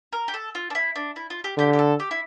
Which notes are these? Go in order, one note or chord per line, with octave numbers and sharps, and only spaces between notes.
A#4
G4
A4
F4
D4
E4
D4
E4
F4
G4
D3 G4
G4
A4
G4
E4